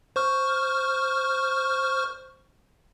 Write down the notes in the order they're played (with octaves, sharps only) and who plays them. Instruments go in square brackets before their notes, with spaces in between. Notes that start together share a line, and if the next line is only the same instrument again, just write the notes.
[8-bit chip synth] C5 C#6 F6